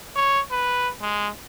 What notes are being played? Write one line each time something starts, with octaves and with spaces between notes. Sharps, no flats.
C#5
B4
G#3